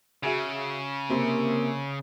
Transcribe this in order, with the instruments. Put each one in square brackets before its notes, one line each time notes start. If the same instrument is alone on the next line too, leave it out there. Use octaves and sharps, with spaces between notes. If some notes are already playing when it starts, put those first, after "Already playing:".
[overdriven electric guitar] C#3 [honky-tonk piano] F#4 G#4 E5
[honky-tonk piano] C3 C5 [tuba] A#3